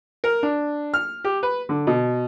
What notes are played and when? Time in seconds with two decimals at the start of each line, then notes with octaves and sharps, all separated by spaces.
0.24 A#4
0.43 D4
0.94 F6
1.24 G4
1.43 B4
1.69 D3
1.87 B2